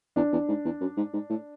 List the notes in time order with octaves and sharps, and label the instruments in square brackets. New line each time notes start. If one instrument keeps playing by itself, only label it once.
[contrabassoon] E2 [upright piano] D4
[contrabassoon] E2
G#2
E2
F#2
G#2
G#2
A2